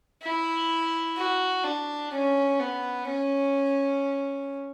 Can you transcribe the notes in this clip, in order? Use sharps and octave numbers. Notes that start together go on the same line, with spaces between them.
E4
F#4
D4
C#4
B3
C#4